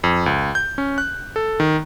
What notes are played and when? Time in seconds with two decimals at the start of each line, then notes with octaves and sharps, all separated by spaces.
0.04 F2
0.26 C#2
0.55 G6
0.78 C#4
0.98 F#6
1.36 A4
1.60 D#3